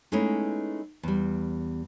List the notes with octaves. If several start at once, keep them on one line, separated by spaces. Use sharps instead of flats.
G#3 A3 B3 C#4 D#4 E4
E2 G3